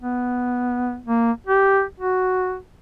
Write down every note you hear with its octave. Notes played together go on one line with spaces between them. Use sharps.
B3
A#3
G4
F#4